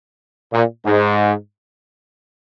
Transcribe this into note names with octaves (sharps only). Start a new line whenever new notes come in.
A#2
G#2